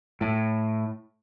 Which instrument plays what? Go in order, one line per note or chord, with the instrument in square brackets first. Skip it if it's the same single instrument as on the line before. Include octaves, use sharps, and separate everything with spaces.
[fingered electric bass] A2